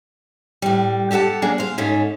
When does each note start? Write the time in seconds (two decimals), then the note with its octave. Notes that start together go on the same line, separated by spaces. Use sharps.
0.62 A2 G3
1.11 G4 A4 D#5 F#5 A5
1.42 F#3 A#3 D4 G#4
1.58 C5 F5
1.78 G#2 A3 C#4